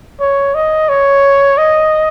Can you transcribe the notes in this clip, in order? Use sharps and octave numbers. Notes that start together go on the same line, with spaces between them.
C#5
D#5
C#5
D#5